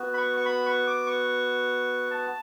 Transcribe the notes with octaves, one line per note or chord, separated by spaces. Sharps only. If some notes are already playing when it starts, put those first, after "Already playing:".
Already playing: B3 F#4
B5
C#6
C#6
B5
C#6
D6
C#6
A5